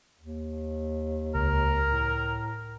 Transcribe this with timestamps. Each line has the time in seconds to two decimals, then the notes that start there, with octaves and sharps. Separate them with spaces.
0.19 D#2
1.35 C#2 A#4
1.90 A2